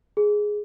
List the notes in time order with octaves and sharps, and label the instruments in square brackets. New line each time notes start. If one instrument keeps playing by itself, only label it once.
[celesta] G#4